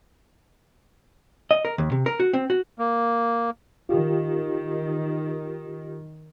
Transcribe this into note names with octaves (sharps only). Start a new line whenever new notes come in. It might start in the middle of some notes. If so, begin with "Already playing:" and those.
D#5
A#4
D#2
C3
A#4
F#4
C4
F#4
A#3
D#3 F4 G4